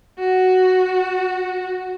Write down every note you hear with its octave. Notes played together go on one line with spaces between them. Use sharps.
F#4